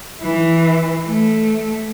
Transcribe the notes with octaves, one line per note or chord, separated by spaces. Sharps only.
E3
A3